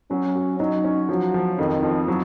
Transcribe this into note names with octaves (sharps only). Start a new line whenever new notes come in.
F#3 C#4
F#4
F#3 D#4
C#4
F3 F#3
F3
F2 D#3
F3
F#3